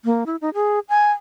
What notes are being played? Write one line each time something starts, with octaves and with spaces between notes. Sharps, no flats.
A#3
E4
D#4
G#4
G#5